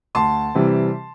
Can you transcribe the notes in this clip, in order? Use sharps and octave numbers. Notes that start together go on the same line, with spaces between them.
D2 A5 C6
C3 E3 G3 C4